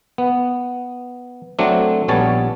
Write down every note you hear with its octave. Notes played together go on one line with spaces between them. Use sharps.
B3
F#3 A3 C4 D4
A#1 G3 B3 C#4 C#5 A5